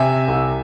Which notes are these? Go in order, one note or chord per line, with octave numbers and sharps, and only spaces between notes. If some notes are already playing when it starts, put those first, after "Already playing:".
Already playing: C3 E5 G#5
C2